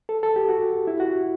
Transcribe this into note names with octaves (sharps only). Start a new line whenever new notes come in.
A4
A4
G4
F#4
E4
F#4